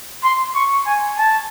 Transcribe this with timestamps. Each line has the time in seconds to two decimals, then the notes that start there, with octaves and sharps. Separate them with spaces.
0.23 C6
0.55 C#6
0.87 G#5
1.18 A5